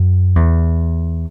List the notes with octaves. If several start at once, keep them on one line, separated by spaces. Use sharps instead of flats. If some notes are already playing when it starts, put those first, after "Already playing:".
Already playing: F#2
E2